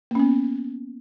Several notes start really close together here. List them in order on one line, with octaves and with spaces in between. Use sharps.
A#3 C#4 B3